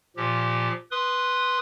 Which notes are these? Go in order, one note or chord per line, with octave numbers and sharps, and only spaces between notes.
A#2 F3 G4
B4 C6 D#6